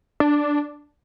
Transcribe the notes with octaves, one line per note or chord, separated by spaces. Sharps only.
D4